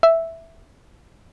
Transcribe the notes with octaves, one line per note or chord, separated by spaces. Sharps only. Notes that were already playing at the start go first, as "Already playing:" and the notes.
E5